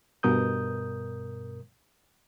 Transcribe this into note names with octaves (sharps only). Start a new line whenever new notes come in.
G2 B2 A#4 D#6 G6